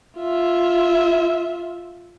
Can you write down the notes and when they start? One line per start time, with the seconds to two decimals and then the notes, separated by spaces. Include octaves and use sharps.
0.19 F4 E5